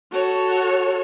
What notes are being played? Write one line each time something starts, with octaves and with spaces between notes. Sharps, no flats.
F#4 A4 C#5